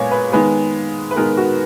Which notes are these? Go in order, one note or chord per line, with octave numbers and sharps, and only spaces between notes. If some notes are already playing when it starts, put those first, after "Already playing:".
Already playing: A#2 G#3 B3 C#5 G#5
B4
D#3 G#3 B3 B4
B4
D#3 G#3 B3 A#4
F#4